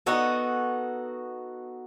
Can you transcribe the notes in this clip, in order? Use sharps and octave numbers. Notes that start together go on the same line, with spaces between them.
B3 D#4 F#4 A4